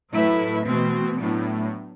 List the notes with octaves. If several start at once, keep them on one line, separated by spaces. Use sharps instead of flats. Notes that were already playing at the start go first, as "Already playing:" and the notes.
A2 F#3 A3 E4 B4 E5
B2 E3 A3 C4
A2 F#3 B3 D4